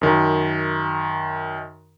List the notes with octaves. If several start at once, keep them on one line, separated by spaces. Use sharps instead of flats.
F#2 D#3